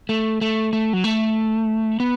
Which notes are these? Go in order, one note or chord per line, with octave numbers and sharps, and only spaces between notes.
A3
A3
A3
F#3
A3
B3